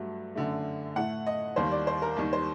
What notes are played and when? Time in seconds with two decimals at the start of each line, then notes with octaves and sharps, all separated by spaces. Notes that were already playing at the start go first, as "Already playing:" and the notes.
Already playing: G2 F#3 A3
0.35 F#2 D3 A3
0.96 A2 A3 F#5
1.26 D#5
1.56 D#2 D#3 G3 A#3 C5
1.71 D5
1.87 C5
2.02 A#4
2.16 D#2 D#3 G3
2.33 C5